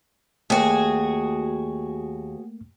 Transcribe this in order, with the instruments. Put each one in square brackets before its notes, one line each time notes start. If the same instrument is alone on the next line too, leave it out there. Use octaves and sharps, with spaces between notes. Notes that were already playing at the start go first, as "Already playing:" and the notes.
[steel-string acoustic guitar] D#2 [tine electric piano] A3 A#3 [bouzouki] F#4 G#4